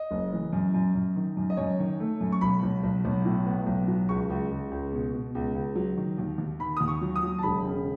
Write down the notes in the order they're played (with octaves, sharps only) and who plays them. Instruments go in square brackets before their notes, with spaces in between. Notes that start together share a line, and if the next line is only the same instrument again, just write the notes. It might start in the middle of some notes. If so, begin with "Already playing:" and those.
Already playing: [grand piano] D#5
F#1
E3
F#2
F#2
F#2
D#3
F#2
D#5
F#2 C#5
D#3
A3
F#2
C#6
B1 B5
B1
B1
B1
A2
B3
B1
F#3
C#2 C#6
C#2
C#2
C#2
B2
B2
C#2
C#2
F#3
D#3
D#2
D#2
D#3 B5
D#2 D#6
C#6
F#3
D#6
F#3
A5
E1 B5
C#3